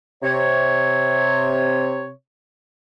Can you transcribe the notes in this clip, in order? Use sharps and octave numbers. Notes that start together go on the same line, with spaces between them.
C3 C#5